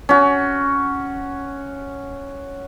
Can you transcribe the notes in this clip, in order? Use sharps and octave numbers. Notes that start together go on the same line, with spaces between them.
C#4 F#4